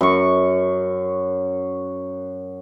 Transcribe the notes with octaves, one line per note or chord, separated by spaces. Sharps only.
F#2 C#6